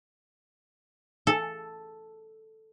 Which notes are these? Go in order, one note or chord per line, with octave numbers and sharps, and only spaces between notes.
A4